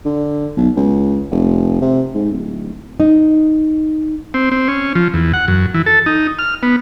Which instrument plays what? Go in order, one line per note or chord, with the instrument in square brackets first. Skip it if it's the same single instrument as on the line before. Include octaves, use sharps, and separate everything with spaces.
[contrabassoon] D3
B1
C#2
F1
C3
G#2
D1
[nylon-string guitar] D#4
[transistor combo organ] C4
C4
C#4
F3
E2
F#5
F#2
E3
A4
D#4
F6
B3